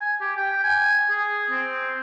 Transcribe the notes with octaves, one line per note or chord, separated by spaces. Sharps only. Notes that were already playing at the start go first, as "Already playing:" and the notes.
G#5
G4
G5
G#5
G#4
C4